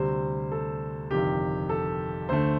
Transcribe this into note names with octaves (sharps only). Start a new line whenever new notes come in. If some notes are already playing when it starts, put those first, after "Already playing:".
Already playing: D2 C3 G3 C5
A4
G1 F2 C3 D#3 G4
A4
D2 D3 A3 C5